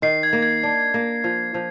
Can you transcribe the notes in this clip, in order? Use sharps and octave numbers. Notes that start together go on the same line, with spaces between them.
D#3 C7
G#6
A#3
G#6
D4
A#3
F3
F3